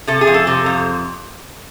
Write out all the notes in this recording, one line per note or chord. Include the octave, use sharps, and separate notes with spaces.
C3 A4
G#4
F2
A4
C3
F2